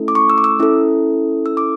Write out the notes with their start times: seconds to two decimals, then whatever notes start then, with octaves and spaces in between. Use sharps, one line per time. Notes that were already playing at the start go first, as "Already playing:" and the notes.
Already playing: A3 C#4 E4 A4
0.08 D6
0.15 C#6
0.30 E6
0.38 D6
0.44 E6
0.59 C#4 E4 A4
1.46 E6
1.57 D6